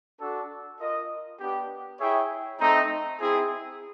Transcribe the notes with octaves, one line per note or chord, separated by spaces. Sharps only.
D4 F#4 A4
F4 A#4 D#5
B3 D4 G4
E4 G#4 C#5 E5 G5
A3 C4 D#4
C4 E4 G#4